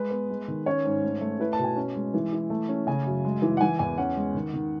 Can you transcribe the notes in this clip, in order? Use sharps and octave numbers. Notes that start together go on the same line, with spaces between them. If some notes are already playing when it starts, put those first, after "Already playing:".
Already playing: G#3 B4
B3
G#3
D#3
C#4 C#5
G#2
A3
A3
E4 B4
A5
B2
G#5
C#4
G#3
E3
E4
A3
C#4
C#3 G#5
F#2
G#3
E3
F#5
E3 G#5
E2 G#5
C#4 F#5
G#3
D#3
D#3